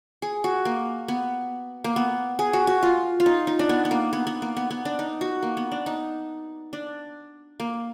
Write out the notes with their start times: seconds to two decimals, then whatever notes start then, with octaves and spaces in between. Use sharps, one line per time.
0.22 G#4
0.44 F#4
0.65 A#3
1.08 B3
1.84 A#3
1.96 B3
2.39 G#4
2.53 F#4
2.67 F#4
2.83 F4
3.20 F4
3.26 D#4
3.47 D#4
3.59 D4
3.69 B3
3.85 B3
3.91 A#3
4.13 B3
4.27 B3
4.42 A#3
4.57 B3
4.71 B3
4.85 D4
4.99 D#4
5.21 F#4
5.43 A#3
5.57 B3
5.72 D4
5.86 D#4
6.73 D4
7.60 A#3